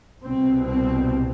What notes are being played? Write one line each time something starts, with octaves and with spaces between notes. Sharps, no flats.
C2 B2 C4
C4